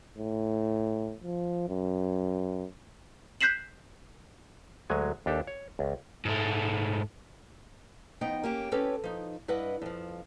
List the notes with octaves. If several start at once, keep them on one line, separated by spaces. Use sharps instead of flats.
A2
F3
F#2
F#6 G6 B6 C7 E7 F#7
D2 F#3 G#3 G#5
D#2 D4 G4 A4
C#5
C#2
G#2 A3
F2 B3 D#4 D#5 G5
A#3 C#4 G4
C4 C#4 G4 A4 B4 C#5
F3 D#4
G2 E4 B4 D#5 F#5
F2 F3